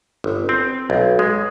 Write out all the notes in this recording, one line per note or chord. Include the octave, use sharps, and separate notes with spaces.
G1
C4
B1
G#3